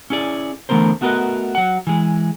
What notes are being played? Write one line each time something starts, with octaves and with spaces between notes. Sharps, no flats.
C#4 E4 G#4 D5
D3 E3 A3 B3 A#4 C5
A3 B3 F#4 A#4 B4 D#5
F#3 F#5
E3 G#3